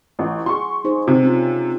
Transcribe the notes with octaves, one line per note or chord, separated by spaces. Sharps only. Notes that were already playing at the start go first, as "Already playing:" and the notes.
A1
F#4 G#4 C6 C#6
D#4 G#4 C5
C3
C4 C#4 F4